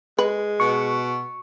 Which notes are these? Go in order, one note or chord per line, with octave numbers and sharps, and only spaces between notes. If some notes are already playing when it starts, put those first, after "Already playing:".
G#3 B4
B2 C#6